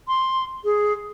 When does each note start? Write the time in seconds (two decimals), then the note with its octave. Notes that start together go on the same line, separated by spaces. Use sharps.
0.08 C6
0.64 G#4